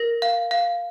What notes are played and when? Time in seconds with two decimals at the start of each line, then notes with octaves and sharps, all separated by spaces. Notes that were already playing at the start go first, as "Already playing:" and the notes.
Already playing: A#4 A#6
0.22 F5
0.51 F5